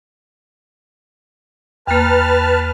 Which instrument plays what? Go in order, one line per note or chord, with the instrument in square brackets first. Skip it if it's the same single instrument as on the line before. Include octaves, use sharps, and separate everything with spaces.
[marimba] E2 A#3 [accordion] B4 A5 F6